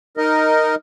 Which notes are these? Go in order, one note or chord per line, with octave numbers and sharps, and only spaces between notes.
D#4 A#4 D#5